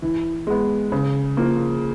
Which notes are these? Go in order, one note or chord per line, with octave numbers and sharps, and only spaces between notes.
E3
G#3 B3
C#3
F3 A#3